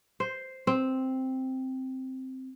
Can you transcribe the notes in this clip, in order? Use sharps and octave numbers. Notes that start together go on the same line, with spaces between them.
C5
C4